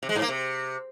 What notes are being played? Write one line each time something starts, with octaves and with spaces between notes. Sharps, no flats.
C3
G#3
G#2
A#3
C3